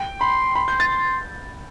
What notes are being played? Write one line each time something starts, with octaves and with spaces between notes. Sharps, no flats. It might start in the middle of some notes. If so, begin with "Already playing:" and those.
Already playing: G5
B5 C6
B5 C6
G6
A6